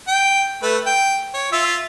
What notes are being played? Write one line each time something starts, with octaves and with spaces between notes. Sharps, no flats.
G5
A3 B4
G5
C#5
F4 E5